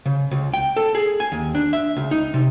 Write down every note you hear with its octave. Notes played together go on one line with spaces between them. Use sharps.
C#3
C#2
G5
A4
G#4
G#5
D#2
D4
E5
C#2
D#4
C3